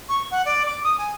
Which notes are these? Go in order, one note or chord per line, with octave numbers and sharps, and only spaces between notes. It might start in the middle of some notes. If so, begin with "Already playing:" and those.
C#6
F#5
D5
D6
D#6
G#5